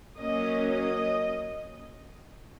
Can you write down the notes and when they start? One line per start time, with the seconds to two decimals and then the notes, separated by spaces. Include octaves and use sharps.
0.17 F#3 A#3 C#4 D#5
0.72 D#5